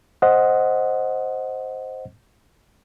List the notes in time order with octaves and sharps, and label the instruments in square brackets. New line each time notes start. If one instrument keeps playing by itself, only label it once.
[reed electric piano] C5 D#5 F#5